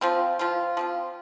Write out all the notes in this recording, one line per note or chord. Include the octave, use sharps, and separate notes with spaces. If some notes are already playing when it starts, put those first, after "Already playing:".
F3 C4 F4
F3 C4 F4
F3 C4 F4